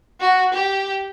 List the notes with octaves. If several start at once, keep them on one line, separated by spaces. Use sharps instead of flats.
F#4
G4